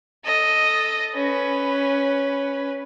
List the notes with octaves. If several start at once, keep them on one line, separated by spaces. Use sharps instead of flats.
A4 D#5
C#4 B4